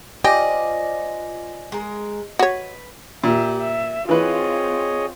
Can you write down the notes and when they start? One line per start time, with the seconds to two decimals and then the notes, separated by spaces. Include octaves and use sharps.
0.24 F4 G4 C5 D5 D#5 G#5 A#6
1.72 G#3 A#4
2.39 F#4 B4 C#5
3.24 A#2 G4 E5
3.61 E5
4.09 E3 C4 F4 G#4 B4 C#5 D#5